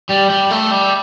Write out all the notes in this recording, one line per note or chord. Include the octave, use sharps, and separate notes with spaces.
G3
G3
A3
G3